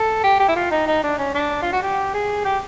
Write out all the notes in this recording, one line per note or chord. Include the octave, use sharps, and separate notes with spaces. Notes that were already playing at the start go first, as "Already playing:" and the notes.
Already playing: A4
G4
G4
E4
F4
D#4
D#4
D4
C#4
D4
F4
F#4
G4
G#4
G4